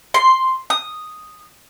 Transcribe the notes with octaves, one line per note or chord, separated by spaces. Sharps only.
C6
D#6